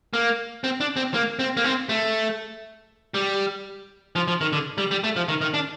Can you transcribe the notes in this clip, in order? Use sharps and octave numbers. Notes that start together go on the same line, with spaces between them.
A#3
C4
D4
C4
A#3
C4
A#3
C4
A3
G3
F3
F3
D#3
D3
G3
G3
A3
F3
D#3
D#3
D4